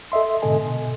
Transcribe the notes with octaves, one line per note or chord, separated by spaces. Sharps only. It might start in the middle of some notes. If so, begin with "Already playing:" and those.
A4 D#5 E5 C6
G#2 B2 D3 A4 D#5 G#5
B2